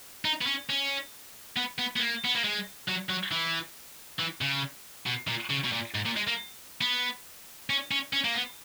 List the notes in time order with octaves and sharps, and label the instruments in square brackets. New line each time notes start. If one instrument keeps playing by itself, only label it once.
[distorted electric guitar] D#4
B3
C#4
C#4
B3
B3
B3
A#3
B3
A#3
G#3
F#3
F#3
E3
E3
C#3
B2
A#2
C#3
B2
A#2
G#2
A#2
G#3
A#3
B3
C#4
C#4
C#4
A#3
B3